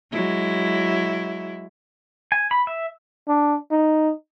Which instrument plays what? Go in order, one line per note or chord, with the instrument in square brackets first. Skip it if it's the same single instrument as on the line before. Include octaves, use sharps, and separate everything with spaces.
[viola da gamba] F#3 G#3 E4
[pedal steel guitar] G#5
B5
E5
[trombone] D4
D#4